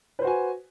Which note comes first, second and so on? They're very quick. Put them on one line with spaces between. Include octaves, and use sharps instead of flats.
B4 C5 F#4 G#5